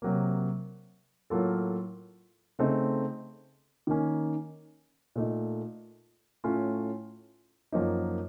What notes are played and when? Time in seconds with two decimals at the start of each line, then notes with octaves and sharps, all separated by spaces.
0.02 C3 F#3 A#3
1.30 A2 F#3 A#3 F4 A4
2.59 C#3 A3 C4 D#4
3.87 D#3 A#3 C#4
5.16 A#2 A3 D#4
6.44 A2 A3 C#4 F4
7.72 F#2 F3 A#3 D#4